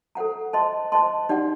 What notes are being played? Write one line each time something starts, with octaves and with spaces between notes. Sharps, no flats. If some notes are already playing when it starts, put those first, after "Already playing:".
A4 C5 F#5 A#5
C5 D#5 A5 C6
C5 D#5 A5 C6
D#4 G4 D5 F#5